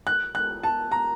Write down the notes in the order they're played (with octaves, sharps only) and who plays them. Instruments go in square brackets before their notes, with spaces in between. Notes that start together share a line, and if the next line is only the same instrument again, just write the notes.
[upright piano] F#6
F#6
A5
A#5